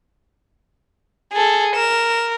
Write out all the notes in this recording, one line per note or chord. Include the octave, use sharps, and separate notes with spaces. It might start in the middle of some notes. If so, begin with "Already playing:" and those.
G#4 A4
A#4 E7